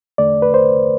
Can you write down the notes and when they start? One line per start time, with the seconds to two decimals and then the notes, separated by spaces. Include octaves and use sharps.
0.18 E2 D3 A3 D5
0.42 B4
0.54 C5